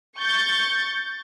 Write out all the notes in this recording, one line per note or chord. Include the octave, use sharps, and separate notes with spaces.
C#6 G6 A6